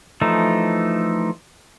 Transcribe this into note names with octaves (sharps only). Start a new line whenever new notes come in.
E3 F3 A3 D#4